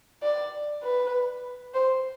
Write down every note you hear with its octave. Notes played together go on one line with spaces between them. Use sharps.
D5
B4
C5